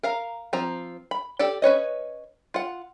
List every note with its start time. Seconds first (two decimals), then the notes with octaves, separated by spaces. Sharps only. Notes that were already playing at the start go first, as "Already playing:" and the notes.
0.03 A#4 F5 A#5
0.53 F3 C4 A#5
1.11 B5
1.39 G4 A4 D5 G5
1.62 C#4 B4 C#5 D#5
2.54 F4 F#5